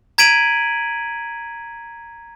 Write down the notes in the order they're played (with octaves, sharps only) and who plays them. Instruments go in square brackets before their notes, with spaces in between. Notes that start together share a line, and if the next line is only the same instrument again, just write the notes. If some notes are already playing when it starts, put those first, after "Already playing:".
[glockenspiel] A#5 G#6 B6 D7 D#7 F#7